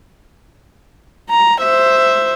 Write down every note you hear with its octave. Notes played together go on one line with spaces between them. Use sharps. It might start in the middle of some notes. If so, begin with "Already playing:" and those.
A#5
C5 E5